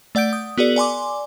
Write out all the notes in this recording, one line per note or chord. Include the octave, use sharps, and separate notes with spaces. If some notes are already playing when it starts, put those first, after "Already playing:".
A3 D5 F#5 G6 D7
D#6
B3 F#4 G#4 A#4 D5 F#7
D5 G#5 C6 D6